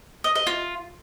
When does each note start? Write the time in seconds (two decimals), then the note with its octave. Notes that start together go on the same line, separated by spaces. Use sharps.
0.24 D#5
0.35 D#5
0.47 F4